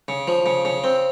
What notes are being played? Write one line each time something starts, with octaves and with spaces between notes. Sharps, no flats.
C#3
F3
C#3
C#3
C4